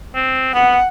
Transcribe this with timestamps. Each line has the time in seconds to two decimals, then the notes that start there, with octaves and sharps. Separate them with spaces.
0.15 C4
0.54 B3 F#5